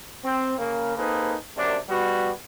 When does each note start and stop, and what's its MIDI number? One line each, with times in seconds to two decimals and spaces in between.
0.24 0.57 60
0.58 0.94 49
0.58 0.94 58
0.97 1.35 58
0.97 1.35 60
0.97 1.35 63
0.97 1.35 68
0.97 1.35 69
0.97 1.35 71
1.57 1.77 42
1.57 1.77 48
1.57 1.77 58
1.57 1.77 62
1.89 2.31 55
1.89 2.31 59
1.89 2.31 66